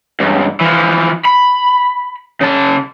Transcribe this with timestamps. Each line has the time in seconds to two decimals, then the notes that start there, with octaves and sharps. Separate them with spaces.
0.20 C#2 G2
0.61 E3 F3
1.25 B5
2.41 C#3 A5